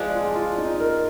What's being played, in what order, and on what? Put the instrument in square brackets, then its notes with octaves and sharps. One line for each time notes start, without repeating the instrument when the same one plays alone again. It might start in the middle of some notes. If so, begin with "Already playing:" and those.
Already playing: [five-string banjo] F3 G#3 D4 [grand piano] G#4
[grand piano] F4
F4
D#4
A#4